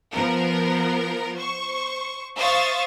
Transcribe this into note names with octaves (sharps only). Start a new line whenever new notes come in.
F3 B3 A#4 A#5
C5 C#6
C5 E5 F5 C#6 D#6 A6